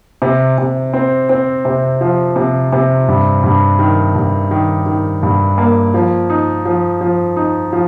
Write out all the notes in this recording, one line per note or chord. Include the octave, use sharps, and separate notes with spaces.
C3
C3
C4
C4
C3
F3
C3
C3
G2
G2
D#3
G2
D#3
D#3
G2
A#3
F3
D#4
F3
F3
D#4
F3